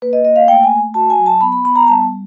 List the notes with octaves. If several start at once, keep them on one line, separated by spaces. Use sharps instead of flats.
A#3 B4
D#5
A#3 D#5
F5
A3 G5
G#5
A3
F#4 A5
G#5
F#3
A5
B3 B5
B5
B3 B5
A#5
G3 A5
G3